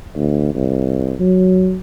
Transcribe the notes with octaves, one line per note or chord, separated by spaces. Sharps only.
D2
C2
F#3